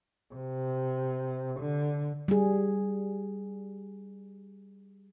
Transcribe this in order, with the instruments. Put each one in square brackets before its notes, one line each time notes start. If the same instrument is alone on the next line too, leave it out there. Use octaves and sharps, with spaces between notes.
[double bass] C3
D3
[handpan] G3 G#4